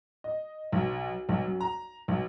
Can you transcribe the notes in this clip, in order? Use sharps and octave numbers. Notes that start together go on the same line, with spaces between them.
D#5
B1
B1
F#2
A#5
B1